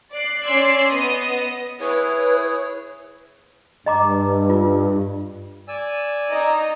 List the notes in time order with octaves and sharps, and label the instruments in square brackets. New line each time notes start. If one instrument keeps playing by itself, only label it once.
[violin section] D5 F#6 C7
C#4 D5 C6 E6 G#6 C7
B3 D#5 D#6
[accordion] E4 G#4 C#5 [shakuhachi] B4
[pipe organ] G2 [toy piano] D#5 A#5 D6
[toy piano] F4
[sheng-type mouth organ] D5 G#5 E6
[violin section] D#4 D#5 A#5